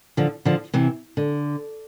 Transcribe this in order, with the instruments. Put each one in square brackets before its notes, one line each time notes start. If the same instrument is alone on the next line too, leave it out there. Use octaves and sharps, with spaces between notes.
[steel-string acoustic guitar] D3 F3
D3 F3
C3 E3
D3